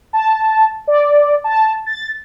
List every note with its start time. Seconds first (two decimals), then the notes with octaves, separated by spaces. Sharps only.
0.13 A5
0.88 D5
1.44 A5
1.86 A6